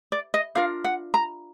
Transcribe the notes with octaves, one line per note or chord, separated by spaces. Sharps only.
D5
D#5
D4 F4 A#4 F5
F#5
A#5